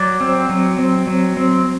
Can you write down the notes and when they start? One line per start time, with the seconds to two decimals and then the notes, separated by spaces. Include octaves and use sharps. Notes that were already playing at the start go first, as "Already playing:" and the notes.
Already playing: F#3 D5
0.21 C4
0.49 F#3
0.79 C4
1.07 F#3
1.37 C4